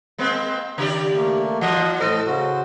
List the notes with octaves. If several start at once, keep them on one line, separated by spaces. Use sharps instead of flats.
G#3 A#3 C4
C#3 G4 D5
A3 A#3
E3 D#5 F#5
A2 A4 C5 D#5
C#3 F#4 C5